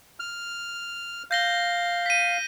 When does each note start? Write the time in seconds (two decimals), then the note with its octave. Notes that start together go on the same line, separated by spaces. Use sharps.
0.20 F6
1.31 F5 G6 A#6 G7
2.06 B6 D#7